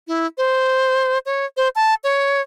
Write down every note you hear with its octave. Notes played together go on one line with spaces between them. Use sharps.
E4
C5
C#5
C5
A5
C#5